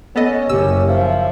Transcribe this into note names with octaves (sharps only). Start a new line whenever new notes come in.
B3 C#4 A4 D#5
F#1 G4 E6
F3 E5